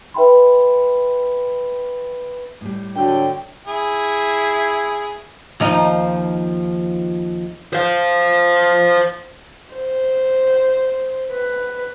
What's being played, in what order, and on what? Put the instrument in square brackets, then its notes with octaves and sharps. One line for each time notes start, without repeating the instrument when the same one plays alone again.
[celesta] B4 E5 G5 B5 C6
[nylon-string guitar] A2 G3
[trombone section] D3 F#3 [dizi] G5
[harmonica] E4 G#4
[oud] D#2 F3 D#4
[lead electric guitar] C5 F5
[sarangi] C5
B4